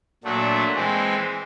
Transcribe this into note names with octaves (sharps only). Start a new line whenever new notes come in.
A#2 F#3 A3 D4
E3 G#3 C4